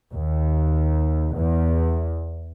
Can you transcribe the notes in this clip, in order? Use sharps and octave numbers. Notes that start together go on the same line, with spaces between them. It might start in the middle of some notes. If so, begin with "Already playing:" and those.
D#2
E2